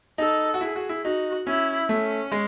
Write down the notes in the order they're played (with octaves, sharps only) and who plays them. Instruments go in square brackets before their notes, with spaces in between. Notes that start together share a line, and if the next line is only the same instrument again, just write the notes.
[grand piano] D#4 [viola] A4
[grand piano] F#4
[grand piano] E4 [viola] G#4
[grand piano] F#4
E4
[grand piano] D#4 [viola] F#4
[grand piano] C#4 [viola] E4
[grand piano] A3 [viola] C#4
[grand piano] G#3